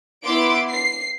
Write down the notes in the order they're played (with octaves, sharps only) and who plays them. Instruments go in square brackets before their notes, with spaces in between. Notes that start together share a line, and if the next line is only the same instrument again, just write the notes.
[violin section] B3 E4 C6 D6 D7
C7